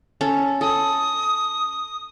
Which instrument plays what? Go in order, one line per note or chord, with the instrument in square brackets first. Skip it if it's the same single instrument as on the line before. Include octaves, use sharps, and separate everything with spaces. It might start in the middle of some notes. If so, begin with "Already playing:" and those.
[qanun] C#4 A4
[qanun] A4 [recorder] D#6